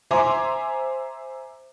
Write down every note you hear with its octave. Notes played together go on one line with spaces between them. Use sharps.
C5 E5 G#5 A#5 C6 D6